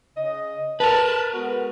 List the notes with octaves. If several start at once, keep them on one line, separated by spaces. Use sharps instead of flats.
C#3 D#5
A#4 B4 A5
G#3 B3 F#4